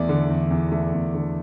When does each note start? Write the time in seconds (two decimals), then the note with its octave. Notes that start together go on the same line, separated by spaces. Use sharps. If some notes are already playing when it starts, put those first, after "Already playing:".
Already playing: E2 A3 D5
0.09 D3
0.30 E2
0.51 E2
0.72 A3
0.93 E2
1.14 D3